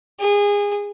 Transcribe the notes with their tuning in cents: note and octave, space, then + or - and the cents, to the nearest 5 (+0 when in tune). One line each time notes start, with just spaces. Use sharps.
G#4 -25